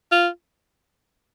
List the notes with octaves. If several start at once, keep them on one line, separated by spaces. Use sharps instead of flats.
F4